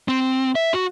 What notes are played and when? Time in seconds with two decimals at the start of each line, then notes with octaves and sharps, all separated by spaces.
0.08 C4
0.55 E5
0.74 F#4